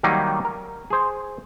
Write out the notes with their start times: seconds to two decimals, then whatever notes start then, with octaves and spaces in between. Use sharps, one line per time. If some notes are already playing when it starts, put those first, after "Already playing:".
0.03 D#3 F#3 G3 A#3 D#4
0.45 A#4
0.90 G#4 C5